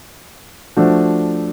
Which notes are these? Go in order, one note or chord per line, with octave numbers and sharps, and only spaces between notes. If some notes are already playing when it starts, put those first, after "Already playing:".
F3 A3 D4 F#4